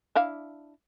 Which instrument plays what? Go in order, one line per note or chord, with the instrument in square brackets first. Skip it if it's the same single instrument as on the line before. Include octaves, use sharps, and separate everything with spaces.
[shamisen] D4 E4 F5